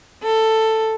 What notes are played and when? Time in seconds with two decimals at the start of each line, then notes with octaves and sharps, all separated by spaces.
0.23 A4